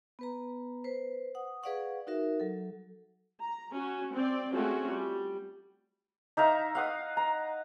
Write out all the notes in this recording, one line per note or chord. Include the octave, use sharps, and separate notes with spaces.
B3 B4 A#5
B4 C5
F#5 D#6
G#4 B4 D5 F5 F#5 C#6
D#4 F#4 A#4 E5
F#3 A4
A#5
C#4 F#4
C4 D5
G#3 A3 C4 C#4 F4 F#4
G3
D#4 E5 F5 A#5
F5 F#5 D#6
A#5